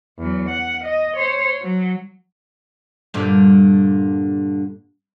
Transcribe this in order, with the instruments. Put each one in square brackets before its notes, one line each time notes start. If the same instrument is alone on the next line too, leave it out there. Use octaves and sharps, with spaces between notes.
[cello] E2 F#3
F#5
D#5
C5 C#5
F#3
[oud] G2 A#2 D3